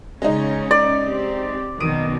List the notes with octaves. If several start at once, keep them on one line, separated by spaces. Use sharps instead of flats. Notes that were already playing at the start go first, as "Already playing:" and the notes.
C#3 G#3 C#4 D#4
D5
C4 G4
F#2 B2 D#3 D#6 D7 D#7